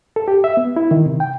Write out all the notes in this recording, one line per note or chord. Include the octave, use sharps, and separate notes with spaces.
A4
G4
E5
B3
E4
D#3
C3
G5